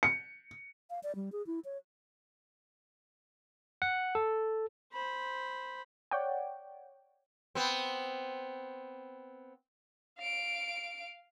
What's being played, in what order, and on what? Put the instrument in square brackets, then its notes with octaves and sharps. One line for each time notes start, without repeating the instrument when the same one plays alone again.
[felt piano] C#7
[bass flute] F5
D5
G3
G#4
E4
C#5
[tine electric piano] F#5
A4
[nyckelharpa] C5 B5
[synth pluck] C#5 D5 F#5 G5
[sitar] B3 C4
[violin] F5 D7